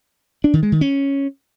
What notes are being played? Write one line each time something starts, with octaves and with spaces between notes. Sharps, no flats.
D4
D#3
G#3
D#3
C#4